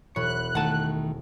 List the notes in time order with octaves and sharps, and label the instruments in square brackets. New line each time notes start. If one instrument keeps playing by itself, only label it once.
[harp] E1 B5 [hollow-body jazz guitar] C#5 [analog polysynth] F#6
[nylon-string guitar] D#3 A3 [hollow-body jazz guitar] F#5 A5